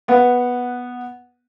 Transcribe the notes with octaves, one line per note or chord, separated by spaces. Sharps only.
B3 F#5